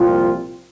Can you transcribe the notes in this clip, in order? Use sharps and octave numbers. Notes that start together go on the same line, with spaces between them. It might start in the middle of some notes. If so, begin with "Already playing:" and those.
Already playing: C2 A#2 F3 C4 F4